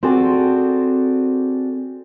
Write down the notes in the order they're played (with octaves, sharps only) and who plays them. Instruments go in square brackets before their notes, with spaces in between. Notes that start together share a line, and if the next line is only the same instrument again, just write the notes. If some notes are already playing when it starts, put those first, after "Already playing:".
[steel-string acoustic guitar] C4 F#4 G#4 A4 D5